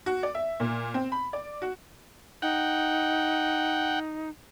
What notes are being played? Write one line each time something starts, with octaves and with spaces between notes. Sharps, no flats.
F#4
D5
E5
A#2
C4
B5
D5
F#4
D#4 F#5 G5